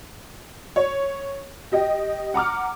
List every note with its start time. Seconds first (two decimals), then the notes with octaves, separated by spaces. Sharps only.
0.76 C#5
1.72 G4 D#5 G5
2.34 F#5 A#5 D6 F6